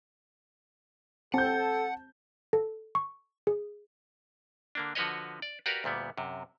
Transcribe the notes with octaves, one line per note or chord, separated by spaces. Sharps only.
C4 A4 F#5 A5 G6
A4
C#6
G#4
D3 A#3 D4
D3 F3 F#4 B4 C#5 D#5
D5
F#4 G4 A#4 B4 D5 F5
D2 A#2 G3 B3
F#2 C3